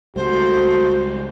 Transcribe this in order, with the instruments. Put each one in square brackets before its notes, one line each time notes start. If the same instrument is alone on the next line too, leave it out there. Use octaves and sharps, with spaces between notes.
[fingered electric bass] C#2 G3 [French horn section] A3 F#4 [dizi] C5